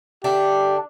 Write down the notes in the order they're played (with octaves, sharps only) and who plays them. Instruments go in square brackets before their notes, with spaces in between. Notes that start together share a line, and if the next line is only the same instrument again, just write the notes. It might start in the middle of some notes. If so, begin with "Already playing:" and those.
[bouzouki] D3 D4 E5 [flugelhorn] G4